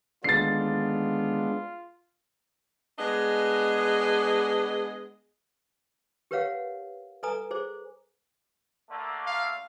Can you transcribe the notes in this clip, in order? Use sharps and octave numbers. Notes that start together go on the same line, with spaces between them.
D#2 D3 G#3 B3 D4 F4 A6 C7
G#3 B3 D4 G#4 D#5
G4 A#4 B4 C#5 F5 F#5
A4 B4 D5 G#5 A#5 D#6
G#4 C5 D5
D3 A3 A#3
F5